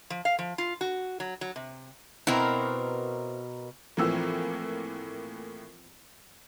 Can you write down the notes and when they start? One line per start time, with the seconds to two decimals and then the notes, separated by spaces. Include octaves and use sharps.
0.10 F3
0.25 F5
0.39 F3
0.58 F4
0.81 F#4
1.20 F#3
1.41 F#3
1.56 C3
2.27 B2 C4 E4 A#4
3.97 A2 E3 F3 A#3 C4 E6